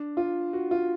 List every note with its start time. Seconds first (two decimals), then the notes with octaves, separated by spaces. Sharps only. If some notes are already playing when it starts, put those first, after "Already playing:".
Already playing: D4
0.17 F4
0.53 F#4
0.71 F4